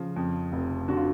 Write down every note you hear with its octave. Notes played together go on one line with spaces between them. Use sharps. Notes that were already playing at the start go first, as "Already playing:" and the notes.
Already playing: C#3 F3
F2
F1
D3 F#4
F4